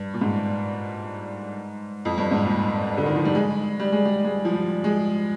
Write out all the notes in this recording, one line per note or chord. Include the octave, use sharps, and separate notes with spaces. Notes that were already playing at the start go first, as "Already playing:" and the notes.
Already playing: G2
A#2
G#2
F2
G2
G#2
A#2
D3
D#3
F3
G3
G#3
G3
G#3
G3
G#3
F3
G3
G#3